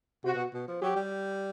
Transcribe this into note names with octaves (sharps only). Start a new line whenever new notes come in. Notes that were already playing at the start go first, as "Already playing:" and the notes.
C3 F#4
B2
B2
F3
F#3 G4
G3